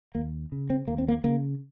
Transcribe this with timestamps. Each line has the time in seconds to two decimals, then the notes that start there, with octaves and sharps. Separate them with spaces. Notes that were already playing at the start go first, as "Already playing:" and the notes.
0.15 D#2 A#3
0.52 C#3
0.70 C4
0.88 D#2 A#3
0.98 C4
1.08 A#3
1.24 C#3 A#3